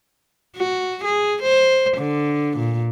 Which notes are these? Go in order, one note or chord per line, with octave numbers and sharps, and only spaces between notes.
F#4
G#4
C5
D3
A#2